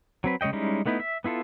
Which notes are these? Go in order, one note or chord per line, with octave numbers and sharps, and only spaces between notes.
F#3 C4 B4
C#3 G#3 C#5 D#5 G5
G3 G#3 C#4 D#4 E4
A3 B3 D#4 E4
E5
B3 E4 F4 A4